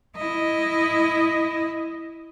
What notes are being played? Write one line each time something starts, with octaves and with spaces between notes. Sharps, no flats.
E4 D#5